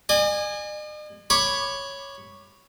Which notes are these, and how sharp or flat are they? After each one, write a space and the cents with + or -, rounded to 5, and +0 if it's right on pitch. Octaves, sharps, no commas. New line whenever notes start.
D#5 -45 G#5 -15
C#5 +0 B5 +0 D6 +20